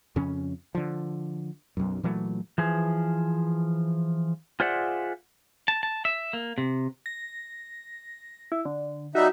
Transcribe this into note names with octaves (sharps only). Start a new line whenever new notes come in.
F2 C#3 C#4
D3 F3
B1 F#2
A#2 E3 F#3 A3
E3 F3 G#4
F4 G#4 C5 D5 E5 F#5
A5
A5
E5
A#3
C3
A#6
E4
D3
G3 D#4 F#4 E5